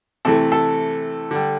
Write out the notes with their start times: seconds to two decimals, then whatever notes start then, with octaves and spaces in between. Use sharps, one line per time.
0.25 C3 E3 A3 A4
0.52 A4
1.31 D3 G3